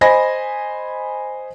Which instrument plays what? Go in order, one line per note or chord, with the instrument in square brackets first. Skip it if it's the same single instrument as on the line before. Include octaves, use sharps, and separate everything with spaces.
[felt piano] C5 D#5 G#5 B5 A#6